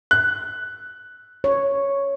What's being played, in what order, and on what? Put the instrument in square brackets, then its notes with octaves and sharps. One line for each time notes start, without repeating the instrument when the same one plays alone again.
[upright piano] F#6
[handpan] C#5